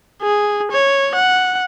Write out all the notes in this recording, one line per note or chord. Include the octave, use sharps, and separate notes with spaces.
G#4
C#5
F#5